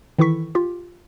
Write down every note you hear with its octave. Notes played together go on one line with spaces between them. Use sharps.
D#3 E3 E4 A4 C#6 B6
F4 G4